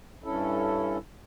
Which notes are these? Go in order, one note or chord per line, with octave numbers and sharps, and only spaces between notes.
G2 C#4 E4 A4